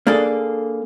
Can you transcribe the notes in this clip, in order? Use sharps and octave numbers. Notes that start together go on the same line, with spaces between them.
A#3 D4 G#4 A4